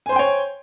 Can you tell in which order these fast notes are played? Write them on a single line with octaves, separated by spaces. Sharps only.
G#5 C5 C6 G5 C#5